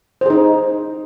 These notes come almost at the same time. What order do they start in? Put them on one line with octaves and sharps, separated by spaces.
C5 G#4 D#4